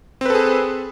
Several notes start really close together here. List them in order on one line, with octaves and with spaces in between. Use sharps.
C4 B4 A4 G#4